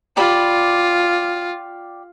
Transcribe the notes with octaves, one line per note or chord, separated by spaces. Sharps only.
F4 G4 D5 B5